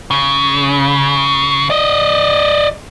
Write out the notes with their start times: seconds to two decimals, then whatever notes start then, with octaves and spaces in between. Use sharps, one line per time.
0.11 C#3
1.70 D5 D#5